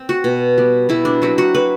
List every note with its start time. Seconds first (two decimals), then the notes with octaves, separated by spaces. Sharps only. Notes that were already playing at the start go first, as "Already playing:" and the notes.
Already playing: C4
0.09 F#4
0.24 B2
0.58 G3 B3
0.89 B2 E4
1.05 D4
1.22 F#3 C4 E4
1.38 F#4
1.55 F#3 B4